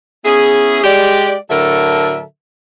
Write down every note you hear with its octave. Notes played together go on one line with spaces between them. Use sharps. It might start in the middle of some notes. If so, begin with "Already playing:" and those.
B3 C#4 E4 G#4
G#3 G4 D5
A2 D3 F#3 A4 A#4 E5